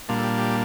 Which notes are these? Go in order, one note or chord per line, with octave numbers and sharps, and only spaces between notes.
A#2 G3 A#3 D4 F4
A4
G4
G4